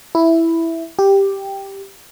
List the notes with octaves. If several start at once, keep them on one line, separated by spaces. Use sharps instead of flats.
E4
G4